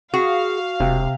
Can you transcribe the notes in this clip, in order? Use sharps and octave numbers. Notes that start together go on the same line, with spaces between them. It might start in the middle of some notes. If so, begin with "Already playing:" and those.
F#4 G#4 F5
E1 C3